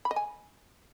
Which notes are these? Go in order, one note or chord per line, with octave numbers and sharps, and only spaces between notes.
B5
D#5
G#5